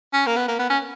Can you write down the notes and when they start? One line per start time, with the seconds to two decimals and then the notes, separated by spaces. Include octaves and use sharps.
0.13 C#4
0.27 A#3
0.36 B3
0.48 A#3
0.59 B3
0.70 C#4